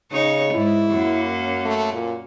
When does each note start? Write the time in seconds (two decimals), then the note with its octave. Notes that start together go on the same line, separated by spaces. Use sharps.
0.12 C#3 D#4 C#5
0.53 G#2 E4
0.90 F#2 A#3 C#4
1.65 A3
1.93 A#2